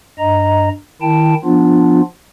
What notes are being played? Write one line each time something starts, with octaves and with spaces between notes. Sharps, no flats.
G2 D#5 A#5
D#3 E4 G5 A5
F3 B3 D4 F4